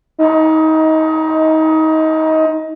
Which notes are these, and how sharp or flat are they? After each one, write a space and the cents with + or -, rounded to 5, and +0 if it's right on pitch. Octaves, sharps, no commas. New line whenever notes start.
D#4 +25